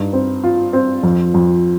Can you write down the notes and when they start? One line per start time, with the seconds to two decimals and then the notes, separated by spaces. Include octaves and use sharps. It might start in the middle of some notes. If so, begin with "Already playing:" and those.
Already playing: G2 D#4
0.13 C4
0.44 F4
0.73 C4
1.03 F2
1.34 F2